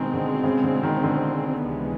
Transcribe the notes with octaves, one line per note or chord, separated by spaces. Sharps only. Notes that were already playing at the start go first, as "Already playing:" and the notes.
Already playing: B2 D#3 G#3 C4
D3
C#3
D3
D#3
D3
C#2 C3 E3 G#3 B3